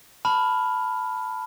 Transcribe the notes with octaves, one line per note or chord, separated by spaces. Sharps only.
A5 B5 F6